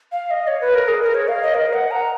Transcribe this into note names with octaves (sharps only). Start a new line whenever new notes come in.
F5
D#5
C#5
B4
A#4
G#4
A#4
C#5
F5
D#5
A#4
F#5
A#5